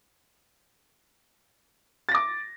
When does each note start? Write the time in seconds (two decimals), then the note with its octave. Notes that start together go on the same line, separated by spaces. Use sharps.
2.09 A6
2.12 A#6
2.15 D6